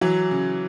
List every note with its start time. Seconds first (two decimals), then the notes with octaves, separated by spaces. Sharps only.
0.01 E3 F#3
0.31 C#3